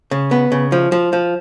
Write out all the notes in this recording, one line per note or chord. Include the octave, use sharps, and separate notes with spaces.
C#3
B3
C#3
F3
F3
F3